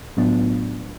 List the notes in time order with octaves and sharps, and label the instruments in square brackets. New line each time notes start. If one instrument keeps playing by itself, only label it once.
[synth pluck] A2 F#3 B3 D4 F4